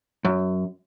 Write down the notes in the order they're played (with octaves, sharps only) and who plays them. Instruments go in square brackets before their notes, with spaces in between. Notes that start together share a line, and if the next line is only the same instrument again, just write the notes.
[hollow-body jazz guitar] F#2